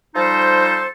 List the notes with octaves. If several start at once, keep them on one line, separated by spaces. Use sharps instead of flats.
F3 G3 D#4 A4 C5